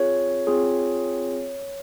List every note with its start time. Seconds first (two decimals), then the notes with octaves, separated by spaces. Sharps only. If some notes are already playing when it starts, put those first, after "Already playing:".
Already playing: C4 F4 G#4 C#5
0.47 C4 F4 G#4